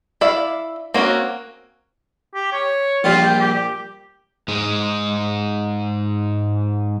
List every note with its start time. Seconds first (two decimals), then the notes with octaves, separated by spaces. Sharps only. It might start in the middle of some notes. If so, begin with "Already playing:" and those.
0.21 E4 D5 E5 F5
0.94 A#3 C4 C#4 F#4
2.35 G4
2.53 C#5
3.04 A#1 A#2 G3 F4
3.25 G5
3.40 G4
4.48 G#2 G#3